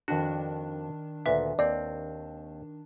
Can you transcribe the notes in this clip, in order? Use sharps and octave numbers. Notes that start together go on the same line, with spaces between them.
F2 D#3 D4 F#4
D2 A#2 B4 E5
D#2 C4 D5